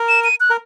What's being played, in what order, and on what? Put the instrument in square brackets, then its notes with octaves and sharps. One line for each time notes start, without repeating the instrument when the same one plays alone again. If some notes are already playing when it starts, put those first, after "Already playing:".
Already playing: [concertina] A#4
[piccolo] E7
D#7
F#6
[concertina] A#4